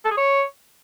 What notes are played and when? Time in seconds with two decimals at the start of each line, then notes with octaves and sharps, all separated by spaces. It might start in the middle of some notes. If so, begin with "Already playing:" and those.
0.05 A4
0.11 G#4
0.17 C#5